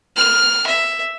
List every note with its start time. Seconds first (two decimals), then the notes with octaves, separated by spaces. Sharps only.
0.16 F6
0.67 E5